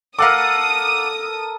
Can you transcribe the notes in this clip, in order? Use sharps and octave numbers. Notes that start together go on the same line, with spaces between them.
A4 A#4 F5 F#5 D6 D#6